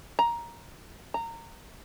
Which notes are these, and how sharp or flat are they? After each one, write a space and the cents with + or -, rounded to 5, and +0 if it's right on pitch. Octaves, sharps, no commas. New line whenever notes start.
A#5 +10
A#5 -20